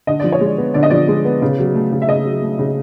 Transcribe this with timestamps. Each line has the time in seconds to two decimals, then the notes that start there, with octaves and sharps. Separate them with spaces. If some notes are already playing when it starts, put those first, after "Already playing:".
0.07 D3 D#5
0.20 F3 D5
0.32 C#5
0.41 G#3 D5
0.58 B3
0.74 D3 D5
0.83 D#5
0.90 F3 D5
1.08 G#3
1.25 B3
1.42 C#3
1.58 F#3
1.75 A3
1.92 C#3
2.02 E5
2.08 C#3 D#5
2.25 F#3
2.42 A3
2.59 C#3